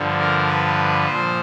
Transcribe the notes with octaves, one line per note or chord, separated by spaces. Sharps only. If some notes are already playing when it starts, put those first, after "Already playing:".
Already playing: G2 D3 F3
A#4
B4
A#2 F3 C5